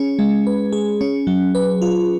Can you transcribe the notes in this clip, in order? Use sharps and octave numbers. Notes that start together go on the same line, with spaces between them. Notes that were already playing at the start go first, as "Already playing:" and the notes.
Already playing: C#4 G#4
G#3
B4
G#4
C#4
F#3
B4
F4